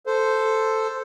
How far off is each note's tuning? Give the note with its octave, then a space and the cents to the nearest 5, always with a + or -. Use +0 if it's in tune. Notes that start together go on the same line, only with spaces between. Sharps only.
A4 +0 C5 -5